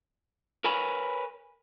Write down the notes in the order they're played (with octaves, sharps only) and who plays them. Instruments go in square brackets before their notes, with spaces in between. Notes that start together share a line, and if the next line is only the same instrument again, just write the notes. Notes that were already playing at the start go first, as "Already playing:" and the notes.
[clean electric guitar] A#4 B4 C#5 G#5 B5